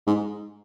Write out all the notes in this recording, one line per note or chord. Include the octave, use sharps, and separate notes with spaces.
G#2